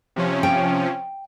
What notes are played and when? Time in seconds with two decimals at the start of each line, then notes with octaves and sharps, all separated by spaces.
0.16 C3 F3 C#4
0.43 G5